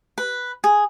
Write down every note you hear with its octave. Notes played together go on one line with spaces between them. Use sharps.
B4
G#4